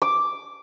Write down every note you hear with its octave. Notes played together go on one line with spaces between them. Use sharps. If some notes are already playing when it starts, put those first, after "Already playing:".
D6